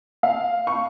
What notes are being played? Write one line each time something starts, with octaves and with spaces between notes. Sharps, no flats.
F5
C#6